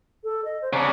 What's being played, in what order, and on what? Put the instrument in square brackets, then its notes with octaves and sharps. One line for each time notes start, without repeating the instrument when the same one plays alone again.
[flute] A4
D#5
C5
[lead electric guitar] C#3 D4 [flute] A#5